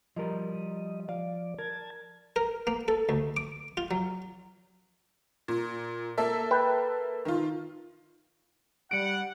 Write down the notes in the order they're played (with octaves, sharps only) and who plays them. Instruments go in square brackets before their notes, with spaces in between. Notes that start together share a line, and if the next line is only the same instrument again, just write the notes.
[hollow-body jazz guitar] F3 G3 A#4 [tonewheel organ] D#5
[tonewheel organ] F3 D5 [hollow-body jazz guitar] F5
[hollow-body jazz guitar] A#4 [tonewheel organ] A5 G#6
[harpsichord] A#4
A#3
A4
D2
D6
F4
F#3
[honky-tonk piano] A#2
A#3 A4 E5
[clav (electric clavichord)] B4 G5
[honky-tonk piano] D#3 F4
[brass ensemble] G3 F#5 [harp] C#7 D7